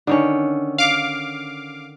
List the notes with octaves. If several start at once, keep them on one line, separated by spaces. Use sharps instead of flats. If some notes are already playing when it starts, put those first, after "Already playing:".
D3 D#3 C#4
F5 D6